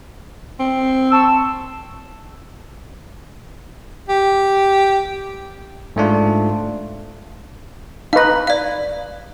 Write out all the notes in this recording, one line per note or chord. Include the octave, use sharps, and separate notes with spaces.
C4
A5 C#6 E6
G4
G#2 A3 D4 F4
D#4 B4 F5 A#6
D5 F5